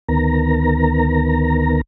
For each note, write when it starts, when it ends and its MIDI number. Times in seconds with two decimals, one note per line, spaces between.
0.09 1.81 38
0.09 1.81 51
0.09 1.81 59
0.09 1.81 70
0.09 1.81 82